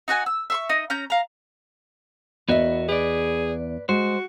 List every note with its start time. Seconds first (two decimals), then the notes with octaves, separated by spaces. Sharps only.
0.08 D#4 F#4 F#5 G#5
0.26 E6
0.50 E5 C6 C#6
0.70 D#4 D#5
0.90 C#4 A#5 G6
1.10 F5 A#5
2.49 E2 B3 F#4 A#4 D#5 E5
2.89 G#4 B4 D5
3.89 G#3 F#4 C5